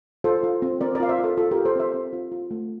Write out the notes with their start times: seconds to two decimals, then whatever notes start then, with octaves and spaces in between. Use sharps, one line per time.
0.24 F4 A4 C5
0.43 F4
0.62 C4
0.81 C4 A#4 D5
0.95 A#4 D5
1.00 F4 F5
1.09 C5 E5
1.19 F4
1.24 A4
1.37 F4 A4
1.51 G4 A#4
1.56 F4
1.65 A4 C5
1.76 C4 C5 E5
1.94 C4
2.13 F4
2.32 F4
2.51 A3